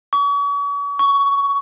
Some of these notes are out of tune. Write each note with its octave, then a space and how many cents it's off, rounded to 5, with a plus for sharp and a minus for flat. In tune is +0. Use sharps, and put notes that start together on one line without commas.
C#6 +40
C#6 +15